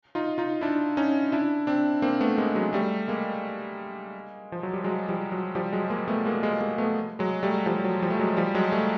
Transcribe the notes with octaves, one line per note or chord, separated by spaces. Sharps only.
D#4 F4
D#4 F4
D4 E4
C#4 D#4
D4 E4
C4 D4
A#3 C4
A3 B3
G#3 A#3
F#3 G#3
G3 A3
G#3 A#3
F3
F#3
G3
F#3 G#3
F3 G3
F#3
F3 G3
F#3 G#3
G#3 A#3
A3 B3
G#3 A#3
G#3 A#3
G#3 A#3
A3 B3
F#3 G#3
G3 A3
F3 G3
F#3
F3 G3
A3
F#3 G#3
F3 G3
F#3 G#3
G3 A3